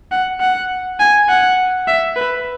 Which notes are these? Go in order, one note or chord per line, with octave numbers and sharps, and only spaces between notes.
F#5
F#5
G#5
F#5
E5
B4